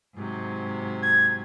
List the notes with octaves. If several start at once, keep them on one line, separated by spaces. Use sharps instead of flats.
G#2 C3 F#3
G#6